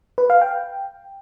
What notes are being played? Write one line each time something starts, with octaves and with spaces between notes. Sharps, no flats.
B4
F5
G5